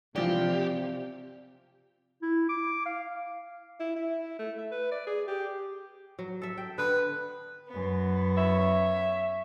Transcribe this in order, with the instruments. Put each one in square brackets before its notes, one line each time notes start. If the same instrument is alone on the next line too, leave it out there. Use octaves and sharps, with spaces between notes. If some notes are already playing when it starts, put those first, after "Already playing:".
[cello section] C3 [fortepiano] E3 F3 F4 [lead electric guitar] G4 [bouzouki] D5
[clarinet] E4
D6
F5
[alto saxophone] E4
E4
A3
E5
B4
D5
G#4
G4
[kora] F#3
A4 E5
G5
[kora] D3 B3 [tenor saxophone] B4
[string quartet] F#2 B3
[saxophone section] C#5 E5